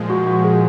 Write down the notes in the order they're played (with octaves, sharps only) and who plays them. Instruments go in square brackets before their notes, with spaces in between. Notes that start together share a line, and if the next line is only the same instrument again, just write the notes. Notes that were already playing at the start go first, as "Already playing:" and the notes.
Already playing: [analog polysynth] A#2 F3 G#3
[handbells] F#4
F#4
G#4